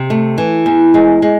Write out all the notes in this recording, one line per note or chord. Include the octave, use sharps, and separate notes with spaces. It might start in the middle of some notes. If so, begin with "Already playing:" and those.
Already playing: C3
A3
E3
E2
G#3
G#3